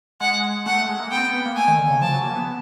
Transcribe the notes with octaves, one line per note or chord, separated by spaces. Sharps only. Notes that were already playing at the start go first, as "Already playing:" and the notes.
G#3 F#5
A3 F#5
A3
G#3
A#3
B3 G5
C4
B3
B3
A#3
A3 G#5
D#3
D3
C#3
F3 A5
F#3
A#3
B3